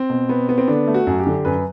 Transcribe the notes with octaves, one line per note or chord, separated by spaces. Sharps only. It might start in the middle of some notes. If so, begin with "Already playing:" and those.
Already playing: C4
B2
B3
B3
C4
D3 D4
A3
F#4
F#2
G4
D3
F#2 B4